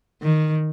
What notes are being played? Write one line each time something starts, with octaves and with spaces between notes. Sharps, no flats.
D#3